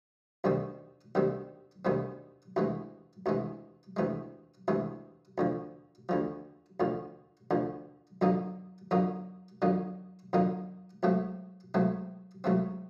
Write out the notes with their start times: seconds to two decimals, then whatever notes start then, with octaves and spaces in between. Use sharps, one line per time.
0.44 D2 C3 D#3 G3 C4
1.15 D2 C3 D#3 G3 C4
1.85 D2 C3 D#3 G3 C4
2.56 D2 C3 E3 G#3
3.26 D2 C3 E3 G#3
3.97 D2 C3 E3 G#3
4.68 D2 C3 E3 G#3
5.38 D2 D3 F3
6.09 D2 D3 F3
6.80 D2 D3 F3
7.51 D2 D3 F3
8.21 F2 D3 F#3 A#3 D#4
8.91 F2 D3 F#3 A#3 D#4
9.62 F2 D3 F#3 A#3 D#4
10.33 F2 D3 F#3 A#3 D#4
11.03 C#2 C#3 F#3 A3 C4
11.74 C#2 C#3 F#3 A3 C4
12.44 C#2 C#3 F#3 A3 C4